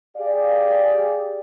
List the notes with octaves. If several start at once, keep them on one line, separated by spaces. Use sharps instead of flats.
G4 G#4 D5 F5